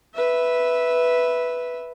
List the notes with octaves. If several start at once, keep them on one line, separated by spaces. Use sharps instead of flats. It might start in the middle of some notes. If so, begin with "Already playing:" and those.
B4 E5